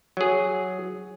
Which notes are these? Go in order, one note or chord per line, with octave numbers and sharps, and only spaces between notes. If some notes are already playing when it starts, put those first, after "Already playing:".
F#3 G#4